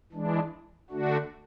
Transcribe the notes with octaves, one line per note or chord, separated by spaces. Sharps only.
E3 G#3 D4
D3 A3 D4 F#4